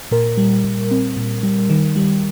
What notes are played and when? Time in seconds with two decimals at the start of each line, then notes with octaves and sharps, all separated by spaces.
0.11 A#2 A#4
0.37 G3
0.64 A#2
0.91 C4
1.17 A#2
1.43 G3
1.70 D#3
1.96 G3